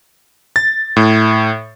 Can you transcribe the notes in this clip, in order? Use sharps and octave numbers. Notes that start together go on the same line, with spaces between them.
A6
A2